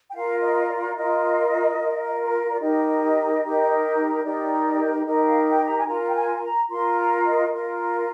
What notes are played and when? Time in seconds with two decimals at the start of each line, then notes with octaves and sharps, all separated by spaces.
0.10 G5
0.14 F4 A#4 F5
0.42 D#5
0.69 D5
0.92 F5
0.96 F4 A#4 D#5
1.78 F4 A#4
2.51 D5
2.60 D#4 G4 A#4 D#5
3.42 D#4 G4 A#4
4.23 D#4 G4 A#4 D5
5.05 D#4 G4 A#4 D#5
5.25 F5
5.47 G5
5.66 A#5
5.78 G#5
5.87 F4 A#4 A#5
6.06 G5
6.15 G#5
6.42 A#5
6.69 F4 A#4 C6
6.97 A#5
7.24 D#5
7.51 F4 A#4